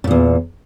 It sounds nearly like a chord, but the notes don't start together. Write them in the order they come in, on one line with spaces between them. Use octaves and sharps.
C#3 A#2 E2